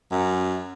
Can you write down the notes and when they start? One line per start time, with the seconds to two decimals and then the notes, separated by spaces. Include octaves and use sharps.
0.11 F#2